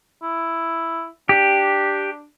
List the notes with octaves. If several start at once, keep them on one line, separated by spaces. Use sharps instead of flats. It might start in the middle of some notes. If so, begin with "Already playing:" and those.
E4
D4 G4